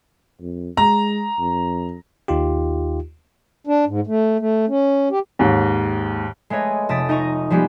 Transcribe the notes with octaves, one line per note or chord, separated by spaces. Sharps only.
F2
G#3 A#5
F2
D#2 D#4 F4 G4
D4
G#2
A3
A3
C#4
G4
D#2 G#2
G#3 A3 B4 C#5 D#5
F1 A5 D#6 A6 B6 D7
D#4 D#5 A#5 C#6
F3 G3 G#3 B3 G4